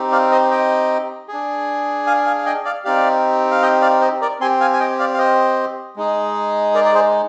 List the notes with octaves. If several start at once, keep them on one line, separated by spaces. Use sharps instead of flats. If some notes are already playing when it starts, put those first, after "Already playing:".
Already playing: C4 D#4 G4
D5 F5
C5 D#5
D#5 G5
D4 G#4
F5 G#5
F5 G#5
F5
D#5 G5
D5 F5
C4 D#4 G4 D5 F5
F5
D#5 G5
D5 F5
C5 D#5
A#4 D5
C4 G4 G#5 C6
F5 G#5
G#5
D#5 G5
D5 F5
F5
C5 D#5
G#3 D#4 G#4
A#4 D5
D5
G#4 C5